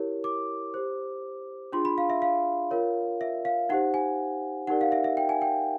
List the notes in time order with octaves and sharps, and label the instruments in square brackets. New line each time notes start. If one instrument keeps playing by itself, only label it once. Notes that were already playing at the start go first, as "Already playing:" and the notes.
Already playing: [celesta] E4 G4 A#4 C#5
D6
G4 C5
D4 F4 G#4 C6
B5
F5
E5
F5
F4 A#4 C#5
E5
F5
D#4 G4 C5 F#5
G#5
D#4 G4 A#4 D5 F#5
F5
E5
E5
G5
G#5
G5